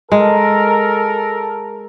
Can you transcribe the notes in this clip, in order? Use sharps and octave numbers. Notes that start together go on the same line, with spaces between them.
G#3 A4 A#4